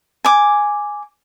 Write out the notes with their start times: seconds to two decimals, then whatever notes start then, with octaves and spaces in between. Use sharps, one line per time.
0.25 G#5 D6